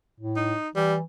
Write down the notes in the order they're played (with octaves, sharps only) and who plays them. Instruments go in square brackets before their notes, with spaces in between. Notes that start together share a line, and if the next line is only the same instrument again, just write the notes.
[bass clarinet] A2
[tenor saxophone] D#4
[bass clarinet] E3 [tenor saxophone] G3